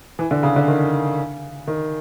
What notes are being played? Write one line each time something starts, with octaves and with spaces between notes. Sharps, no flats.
E3
D3
C#3
D3
D#3
D#3